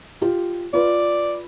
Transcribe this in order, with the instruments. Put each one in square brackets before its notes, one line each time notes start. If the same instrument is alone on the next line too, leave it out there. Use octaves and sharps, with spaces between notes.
[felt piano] F4 G4
[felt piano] F4 B4 [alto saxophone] D5